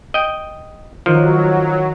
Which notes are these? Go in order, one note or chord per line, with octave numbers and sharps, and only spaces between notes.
D#5 G5
D#3 F3 F#3 F#6